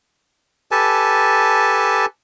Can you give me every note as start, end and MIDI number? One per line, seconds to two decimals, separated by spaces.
0.71 2.06 67
0.71 2.06 69
0.71 2.06 71
0.71 2.06 80
0.71 2.06 81